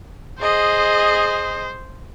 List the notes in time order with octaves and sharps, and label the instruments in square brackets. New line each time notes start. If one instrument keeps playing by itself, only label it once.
[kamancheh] G#4 D#5 [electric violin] C5